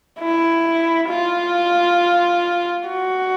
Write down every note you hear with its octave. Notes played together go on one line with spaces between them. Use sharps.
E4
F4
F#4